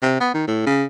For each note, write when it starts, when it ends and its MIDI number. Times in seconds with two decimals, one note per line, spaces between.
0.03 0.16 48
0.21 0.31 59
0.34 0.44 51
0.48 0.64 45
0.67 0.84 49